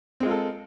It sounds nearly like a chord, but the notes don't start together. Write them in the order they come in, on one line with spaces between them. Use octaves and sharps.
C4 G#3 F4 A#4 A4